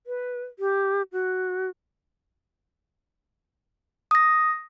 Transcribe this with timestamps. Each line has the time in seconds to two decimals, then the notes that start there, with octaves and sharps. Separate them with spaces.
0.07 B4
0.59 G4
1.12 F#4
4.11 D#6 A#6